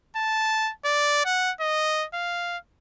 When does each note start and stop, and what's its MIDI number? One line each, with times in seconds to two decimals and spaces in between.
0.17 0.72 81
0.85 1.22 74
1.26 1.52 78
1.60 2.06 75
2.14 2.58 77